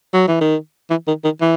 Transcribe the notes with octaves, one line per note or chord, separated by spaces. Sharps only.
F#3
E3
D#3
E3
D#3
D#3
E3